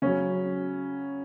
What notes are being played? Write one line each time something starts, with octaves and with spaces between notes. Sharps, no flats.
C#3 F#3 C#4